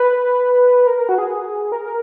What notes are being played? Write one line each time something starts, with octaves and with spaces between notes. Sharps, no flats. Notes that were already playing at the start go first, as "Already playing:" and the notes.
Already playing: B4
A#4
A#4
F#4
G#4
A#4
A#4